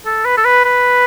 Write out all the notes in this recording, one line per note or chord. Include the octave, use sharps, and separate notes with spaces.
A4
B4
A4
B4
B4